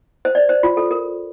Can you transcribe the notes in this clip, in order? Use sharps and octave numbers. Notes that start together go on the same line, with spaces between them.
C5
D5
C5
F4
A4
A#4